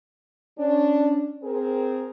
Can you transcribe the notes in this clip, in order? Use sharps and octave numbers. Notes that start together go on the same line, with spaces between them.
C#4 D4
C4 G#4 A#4